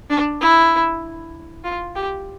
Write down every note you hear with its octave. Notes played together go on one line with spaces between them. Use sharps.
D4
E4
F4
G4